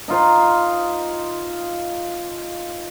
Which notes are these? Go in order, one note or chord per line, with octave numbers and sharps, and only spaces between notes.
D#4 F4 C5